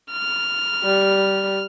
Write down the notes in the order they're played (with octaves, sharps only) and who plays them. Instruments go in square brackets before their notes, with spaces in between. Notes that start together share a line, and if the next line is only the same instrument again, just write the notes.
[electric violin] F6
[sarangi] G3